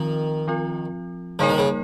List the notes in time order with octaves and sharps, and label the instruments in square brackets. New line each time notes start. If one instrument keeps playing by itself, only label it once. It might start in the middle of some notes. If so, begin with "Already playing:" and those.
Already playing: [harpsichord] D#3 [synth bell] F3 C4 F4
[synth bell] F3 C4 F4
[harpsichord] C#3 [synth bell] G3 A#3 D#4 A#4 C#5
[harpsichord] D#3
C#3